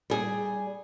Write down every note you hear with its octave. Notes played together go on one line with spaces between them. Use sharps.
G3 G#4